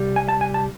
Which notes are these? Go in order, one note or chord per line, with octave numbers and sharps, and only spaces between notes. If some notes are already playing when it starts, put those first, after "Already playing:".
Already playing: C2 G3
G#5
A5
G#5
A5